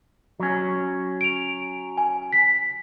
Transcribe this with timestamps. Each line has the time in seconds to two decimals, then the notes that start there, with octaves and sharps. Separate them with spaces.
0.40 F#3 C#4
1.21 D7 F7
1.97 G#5
2.32 B6